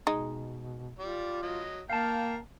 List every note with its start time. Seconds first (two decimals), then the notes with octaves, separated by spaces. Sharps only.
0.07 B2 G#3 D#4
0.99 G3 F4 D5
1.43 F#3 D#5
1.90 A#3 A#4 F5 G5 A5